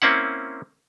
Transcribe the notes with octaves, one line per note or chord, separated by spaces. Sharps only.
A#3 C4 C#4 E4 F#5